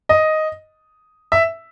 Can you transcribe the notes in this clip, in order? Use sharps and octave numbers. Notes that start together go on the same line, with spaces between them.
D#5
E5